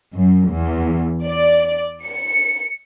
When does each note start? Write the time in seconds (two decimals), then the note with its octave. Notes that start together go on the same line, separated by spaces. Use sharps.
0.15 F#2
0.51 E2
1.24 D5
2.06 C#7